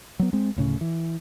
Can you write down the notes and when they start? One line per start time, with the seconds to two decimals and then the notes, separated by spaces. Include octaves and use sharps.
0.19 F#3 B3
0.33 G#3 C4
0.56 D1 A2 C#3 C#4
0.81 E3